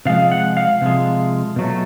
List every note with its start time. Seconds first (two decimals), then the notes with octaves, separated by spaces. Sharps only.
0.05 C3 F3 G#3 F5
0.32 F#5
0.57 F5
0.82 C3 F3 G#3
1.56 B2 F#3 A3